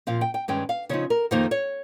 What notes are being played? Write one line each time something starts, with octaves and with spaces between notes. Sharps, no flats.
A#2 F3 C4 F5
G5
G5
G2 D#3 G#3 C#4 G5
F5
C#3 F3 C4 D#4 C#5
A#4
F2 D#3 A#3 D#4 C5
C#5